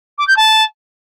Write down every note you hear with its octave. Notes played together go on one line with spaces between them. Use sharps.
D6
G6
A5